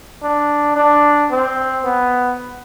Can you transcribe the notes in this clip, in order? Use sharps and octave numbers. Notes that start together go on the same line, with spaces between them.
D4
D4
C4
B3